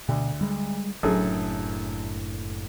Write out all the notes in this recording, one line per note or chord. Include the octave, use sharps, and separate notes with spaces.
D2 B2
G3 G#3
F#1 F#2 A2 D4 G#4 A4